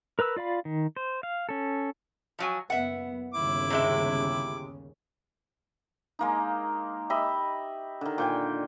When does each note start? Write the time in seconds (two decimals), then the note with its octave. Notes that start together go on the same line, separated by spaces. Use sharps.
0.19 A#4 B4 B5 E6
0.37 F4 D5 F5 B5
0.65 D#3
0.96 C5
1.23 F5
1.49 C#4 A4
2.39 F3 F#3 G#5
2.70 F#1 B3 E5 F#5
3.34 G1 D#2 C#3 E4 D6
3.70 C3 G#3 E5
6.19 G#3 A#3 D#4
7.10 G4 D#5 E5 B5
8.01 D3 D#3
8.18 A#2 G5 G#5